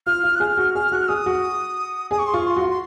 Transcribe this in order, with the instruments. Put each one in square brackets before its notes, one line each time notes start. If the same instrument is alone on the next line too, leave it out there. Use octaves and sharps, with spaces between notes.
[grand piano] F4 [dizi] F6
[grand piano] F4
[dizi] F#6
[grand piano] G#4 [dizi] F6
[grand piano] F#4
[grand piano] G#4 [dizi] F6
[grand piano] F#4 [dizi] F#6
[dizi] F6
[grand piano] G#4 [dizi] D#6
[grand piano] F#4
[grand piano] G#4 [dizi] D#6
[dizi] C#6
C6
[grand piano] F4 [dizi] C#6
[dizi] C6
[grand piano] F#4
[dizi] C6